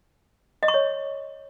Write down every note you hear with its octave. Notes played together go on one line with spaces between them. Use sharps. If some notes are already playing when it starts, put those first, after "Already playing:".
D#5
C#6
C#5